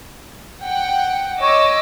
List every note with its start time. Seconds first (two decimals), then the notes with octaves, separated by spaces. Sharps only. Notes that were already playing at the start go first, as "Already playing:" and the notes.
0.63 F#5 G5
1.41 C#5 D#5 D6 E6